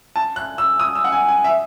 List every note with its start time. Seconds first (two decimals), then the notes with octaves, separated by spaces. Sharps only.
0.16 A5
0.36 F#6
0.58 E6
0.80 D#6
0.95 E6
1.04 F#5
1.12 G#5
1.28 G#5
1.44 E5